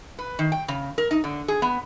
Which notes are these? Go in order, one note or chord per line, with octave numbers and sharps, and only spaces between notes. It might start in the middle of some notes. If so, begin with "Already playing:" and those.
B4
D#3
G5
C#3
A#4
D#4
D3
G#4
B3